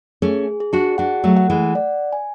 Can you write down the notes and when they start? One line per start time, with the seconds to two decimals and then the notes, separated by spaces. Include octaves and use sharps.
0.22 A3 C#4 G#4
0.60 G#4
0.73 D4 F#4
0.98 D4 F#4 F#5
1.24 F#3 A3
1.37 F#5
1.50 E3 G#3
1.75 D5
2.13 G#5